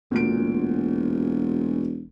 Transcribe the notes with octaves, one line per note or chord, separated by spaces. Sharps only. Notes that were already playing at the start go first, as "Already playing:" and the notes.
E1 D2 A#2 D7